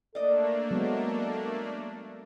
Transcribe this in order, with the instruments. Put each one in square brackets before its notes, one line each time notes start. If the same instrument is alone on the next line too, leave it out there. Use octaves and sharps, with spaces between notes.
[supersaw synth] A3 A#3 D4 [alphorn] A4 [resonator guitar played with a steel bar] D5 D#5
[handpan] F#3 G#3 B3